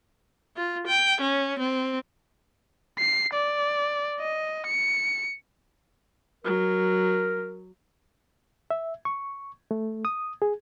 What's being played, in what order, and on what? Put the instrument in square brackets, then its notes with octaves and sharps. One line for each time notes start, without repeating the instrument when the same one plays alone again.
[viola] F4
G5
C#4
C4
[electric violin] C7
D5
D#5
C#7
[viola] F#3 [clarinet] A#4
[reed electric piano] E5
C#6
A3
D#6
G#4